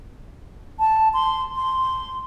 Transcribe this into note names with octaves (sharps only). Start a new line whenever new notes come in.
A5
C6
C6